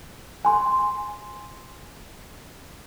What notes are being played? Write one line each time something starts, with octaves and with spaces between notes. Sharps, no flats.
G#5 C6